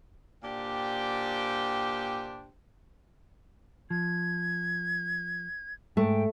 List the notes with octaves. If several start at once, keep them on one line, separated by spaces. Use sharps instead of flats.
A#2 D4 G4 C5 G5
F3 G#6
G#2 G#3 A3 G5